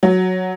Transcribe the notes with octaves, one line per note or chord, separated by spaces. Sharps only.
F#3